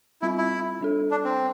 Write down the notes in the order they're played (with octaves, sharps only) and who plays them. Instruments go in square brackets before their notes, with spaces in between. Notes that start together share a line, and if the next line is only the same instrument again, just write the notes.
[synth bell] G3 C4 F4 [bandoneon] E4
[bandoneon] E4
[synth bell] G3 D4 A4
[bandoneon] D4
C4